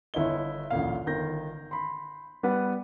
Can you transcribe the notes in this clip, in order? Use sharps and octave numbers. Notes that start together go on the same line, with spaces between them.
G1 E4 C#5 D#5 G7
A1 D2 A#2 F5
G1 D#3 G6 A#6
B5 C6
G3 B3 B4 F#5